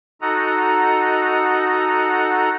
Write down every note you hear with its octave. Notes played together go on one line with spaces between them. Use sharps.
D#4 F#4 A4 D#5 F#5 A#5